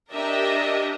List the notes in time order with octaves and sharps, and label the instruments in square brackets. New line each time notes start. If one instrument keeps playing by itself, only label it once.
[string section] D4 G4 A#4 D#5 E5